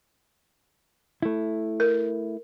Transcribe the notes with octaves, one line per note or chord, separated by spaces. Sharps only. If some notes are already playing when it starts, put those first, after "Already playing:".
A3 E4
A#4